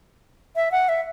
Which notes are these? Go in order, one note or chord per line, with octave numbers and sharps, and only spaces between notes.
E5
F#5
E5